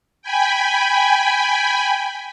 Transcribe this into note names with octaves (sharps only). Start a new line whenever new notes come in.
G5 G#5 B5